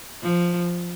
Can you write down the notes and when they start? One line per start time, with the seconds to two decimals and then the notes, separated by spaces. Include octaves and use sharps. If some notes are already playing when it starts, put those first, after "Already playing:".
0.22 F3